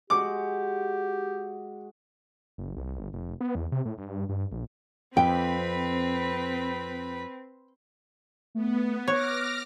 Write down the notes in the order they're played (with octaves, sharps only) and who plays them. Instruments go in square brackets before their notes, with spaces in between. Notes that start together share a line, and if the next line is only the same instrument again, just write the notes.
[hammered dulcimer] G#3 F#4 [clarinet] G4 [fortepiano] D6
[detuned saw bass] F#1
C2
G1
F1
B3
E2
C3
A2
G2
G2
A#1
[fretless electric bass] F2 [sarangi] C4 [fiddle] B4 B5 [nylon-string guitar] G5
[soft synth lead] A3 [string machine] B3
[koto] C#5 [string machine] D6 F6 A#6 [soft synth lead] F#6